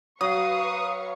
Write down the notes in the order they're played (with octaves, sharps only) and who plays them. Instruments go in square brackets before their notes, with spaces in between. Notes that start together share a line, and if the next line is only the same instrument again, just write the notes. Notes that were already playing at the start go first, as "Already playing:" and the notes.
[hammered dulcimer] F#3 [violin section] B4 F5 C#6 [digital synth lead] D#6